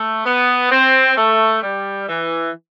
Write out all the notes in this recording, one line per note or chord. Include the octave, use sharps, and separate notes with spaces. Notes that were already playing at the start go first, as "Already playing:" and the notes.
Already playing: A3
B3
C4
A3
G3
E3